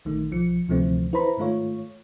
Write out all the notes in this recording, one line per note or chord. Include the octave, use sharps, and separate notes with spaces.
A#1 D#3 A3
B1 F3 C#7
D2 C3 E3 F3 A3 C4
E4 B4 C5 A#5 B5
G#2 D#3 A3 F4 C#5